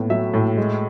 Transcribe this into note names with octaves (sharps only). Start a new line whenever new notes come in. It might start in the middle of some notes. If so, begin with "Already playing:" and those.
Already playing: A2 B3
F#3 E5
A2
G#3